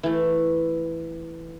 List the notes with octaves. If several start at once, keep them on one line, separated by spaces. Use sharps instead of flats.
E3 A3